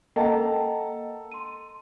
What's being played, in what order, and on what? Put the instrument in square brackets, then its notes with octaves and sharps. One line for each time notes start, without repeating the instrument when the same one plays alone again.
[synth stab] A#3 [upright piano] A4 A5 A#5 [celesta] D#5 F#5 G5
[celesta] C6 D#7